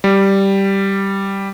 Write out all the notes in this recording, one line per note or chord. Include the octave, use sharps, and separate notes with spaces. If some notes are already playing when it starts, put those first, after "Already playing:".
G3